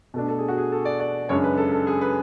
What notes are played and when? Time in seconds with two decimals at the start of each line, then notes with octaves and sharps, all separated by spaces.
0.14 B2 A3 D4
0.28 A4
0.39 G#4
0.48 F#4
0.58 G#4
0.72 A4
0.85 D5
1.00 D5
1.29 F#2 C#3 G#3 D4 C#5
1.44 B4
1.58 A4
1.72 A4
1.87 G#4
2.01 B4